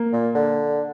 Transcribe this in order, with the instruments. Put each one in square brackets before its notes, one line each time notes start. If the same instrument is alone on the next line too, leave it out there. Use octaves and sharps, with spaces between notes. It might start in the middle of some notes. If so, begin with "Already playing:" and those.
Already playing: [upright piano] A#3
[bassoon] A#2
D3